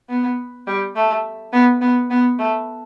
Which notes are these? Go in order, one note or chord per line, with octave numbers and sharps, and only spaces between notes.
B3
G3
A3
B3
B3
B3
A3